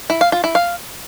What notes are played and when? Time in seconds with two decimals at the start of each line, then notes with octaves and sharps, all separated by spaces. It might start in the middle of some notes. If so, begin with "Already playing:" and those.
0.10 E4
0.21 F5
0.32 F4
0.44 E4
0.55 F5